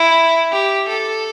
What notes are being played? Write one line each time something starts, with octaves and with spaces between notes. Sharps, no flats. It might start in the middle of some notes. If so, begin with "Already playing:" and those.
Already playing: E4
G4
A4